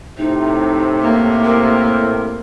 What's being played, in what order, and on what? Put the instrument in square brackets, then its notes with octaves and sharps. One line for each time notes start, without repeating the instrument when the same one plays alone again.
[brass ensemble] A2 C3 [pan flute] D#4
[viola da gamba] A#3
[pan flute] A#4